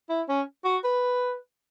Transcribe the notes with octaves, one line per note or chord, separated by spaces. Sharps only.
E4
C#4
F#4
B4